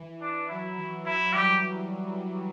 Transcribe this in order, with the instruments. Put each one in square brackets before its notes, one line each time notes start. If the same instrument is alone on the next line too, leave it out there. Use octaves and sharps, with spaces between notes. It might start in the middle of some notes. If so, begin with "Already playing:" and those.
Already playing: [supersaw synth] E3
[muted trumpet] D4
[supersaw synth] F#3 [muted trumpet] E4
[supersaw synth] E3
[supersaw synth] F#3 [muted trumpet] E4
[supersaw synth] E3 G3 [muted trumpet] G4